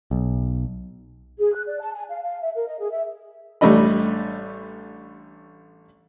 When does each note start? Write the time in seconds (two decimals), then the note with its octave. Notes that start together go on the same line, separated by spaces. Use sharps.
0.11 B1
1.38 G#4
1.54 F#6
1.67 D5
1.80 A5
1.93 G#5
2.09 F5
2.23 F5
2.41 E5
2.55 A#4
2.68 D#5
2.79 G#4
2.91 E5
3.61 A1 G3 A3 D4 D#5 B5